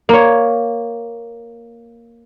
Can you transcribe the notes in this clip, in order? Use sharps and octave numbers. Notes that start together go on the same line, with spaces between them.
A#3 C#5